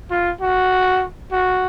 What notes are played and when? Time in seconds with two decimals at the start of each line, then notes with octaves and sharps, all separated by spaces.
0.11 F4
0.41 F#4
1.32 F#4